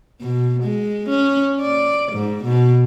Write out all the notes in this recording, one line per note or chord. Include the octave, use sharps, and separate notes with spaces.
B2
G#3
C#4
D5
G#2
B2